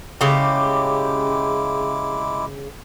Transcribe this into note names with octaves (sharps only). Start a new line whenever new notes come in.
C#3 G#3 E4 G4 D6